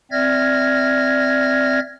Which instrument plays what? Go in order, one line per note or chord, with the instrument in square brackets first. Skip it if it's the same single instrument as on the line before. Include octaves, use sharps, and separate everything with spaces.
[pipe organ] C4 D5 E5 F6 G#6 A#6